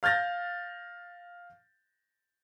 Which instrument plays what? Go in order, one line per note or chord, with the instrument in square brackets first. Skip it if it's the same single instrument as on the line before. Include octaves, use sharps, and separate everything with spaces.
[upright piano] F5 F6 G6 A6 A#6